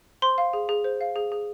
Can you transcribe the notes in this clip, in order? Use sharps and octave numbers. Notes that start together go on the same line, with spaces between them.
C5 C6
F5
G#4
G#4
C5
F5
G#4
G#4